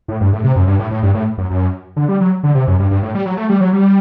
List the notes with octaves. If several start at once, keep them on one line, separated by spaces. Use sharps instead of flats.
A2
G2
A2
C3
F#2
G2
A2
A2
G2
A2
F#2
F#2
D3
G3
F#3
D3
C3
F#2
G2
G2
A2
G3
F#3
A3
G3
F#3
G3